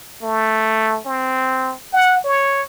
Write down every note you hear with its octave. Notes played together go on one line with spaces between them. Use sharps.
A3
C4
F#5
C#5